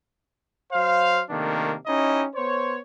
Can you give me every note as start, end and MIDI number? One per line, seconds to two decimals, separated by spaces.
0.72 1.21 54
0.72 1.21 72
0.72 1.21 77
1.30 1.75 48
1.30 1.75 51
1.30 1.75 57
1.30 1.75 58
1.30 1.75 62
1.87 2.25 61
1.87 2.25 63
1.87 2.25 64
1.87 2.25 67
1.87 2.25 75
2.35 2.77 59
2.35 2.77 72
2.35 2.77 73